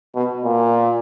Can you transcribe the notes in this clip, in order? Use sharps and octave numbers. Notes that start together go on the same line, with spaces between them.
B2
A#2